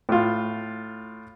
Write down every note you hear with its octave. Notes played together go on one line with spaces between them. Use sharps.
A2 F4